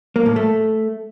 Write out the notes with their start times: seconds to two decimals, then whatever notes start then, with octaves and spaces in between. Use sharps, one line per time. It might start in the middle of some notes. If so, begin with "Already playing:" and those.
0.16 A#3
0.26 A2
0.36 A3